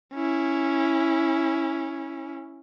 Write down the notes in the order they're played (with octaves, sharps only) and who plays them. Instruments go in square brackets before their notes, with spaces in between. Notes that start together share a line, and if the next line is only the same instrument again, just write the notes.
[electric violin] C#4 E4